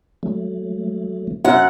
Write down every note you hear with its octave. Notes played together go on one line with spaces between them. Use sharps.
F#3 A3
F#2 F#5 F#6